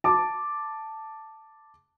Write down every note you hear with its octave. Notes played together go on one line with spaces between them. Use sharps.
A5 D6